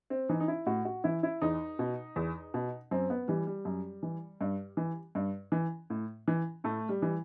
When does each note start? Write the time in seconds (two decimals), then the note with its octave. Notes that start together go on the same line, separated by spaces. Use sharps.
0.10 C4
0.29 E3 D#4
0.40 D#4
0.48 E4
0.66 A2 F#4
0.85 F#4
1.04 E3 E4
1.23 E4
1.42 E2 D#4
1.79 B2
2.16 E2
2.54 B2
2.91 F#2 C4
3.10 B3
3.28 E3 G3
3.47 G3
3.65 F#2
4.03 E3
4.41 G2
4.77 E3
5.15 G2
5.52 E3
5.90 A2
6.28 E3
6.64 A2 A3
6.89 G3
7.02 E3